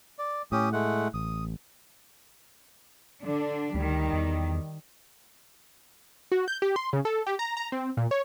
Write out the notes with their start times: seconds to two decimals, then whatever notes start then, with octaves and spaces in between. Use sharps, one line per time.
0.19 D5
0.52 A2 C#4 G4 D#6
0.73 G#3 A3 F#5
1.14 A1 D#6
3.23 D3 D4
3.74 D2 D#3 G3
4.13 E2
6.32 F#4
6.48 G6
6.62 G4
6.76 C6
6.93 C#3
7.05 A4
7.26 G4
7.39 A#5
7.57 A#5
7.72 C4
7.97 A#2
8.11 C#5